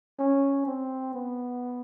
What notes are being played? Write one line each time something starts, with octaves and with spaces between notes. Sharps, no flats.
C#4
C4
B3